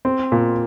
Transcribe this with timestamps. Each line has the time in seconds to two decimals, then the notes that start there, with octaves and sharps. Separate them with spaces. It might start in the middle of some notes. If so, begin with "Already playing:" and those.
0.05 C4
0.32 A#2